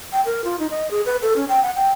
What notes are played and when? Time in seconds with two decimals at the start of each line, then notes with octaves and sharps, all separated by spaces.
0.12 G5
0.25 A#4
0.44 F4
0.59 D#4
0.71 D#5
0.91 G#4
1.06 B4
1.22 A4
1.36 C#4
1.49 G5
1.62 F#5
1.76 G5